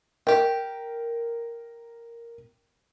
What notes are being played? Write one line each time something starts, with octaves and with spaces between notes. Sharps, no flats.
G4 A#4 G5